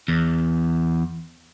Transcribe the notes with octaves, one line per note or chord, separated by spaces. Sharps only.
E2